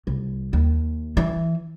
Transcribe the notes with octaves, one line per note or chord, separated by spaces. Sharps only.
C2
D#2
E3